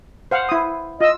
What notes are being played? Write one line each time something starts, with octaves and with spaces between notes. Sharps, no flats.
C5 F5 F#5
E4 D#6
F4 D#5 E6